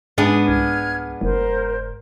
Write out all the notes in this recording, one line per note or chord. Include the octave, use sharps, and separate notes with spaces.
G#2 B3 D4 G#4
C2 F6 G#6
F#1 A#4 C5